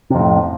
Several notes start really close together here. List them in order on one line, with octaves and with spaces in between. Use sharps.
C3 F2 A2